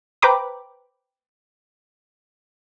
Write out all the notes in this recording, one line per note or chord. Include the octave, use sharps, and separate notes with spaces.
B4 C5 G5 A#5 B5 D6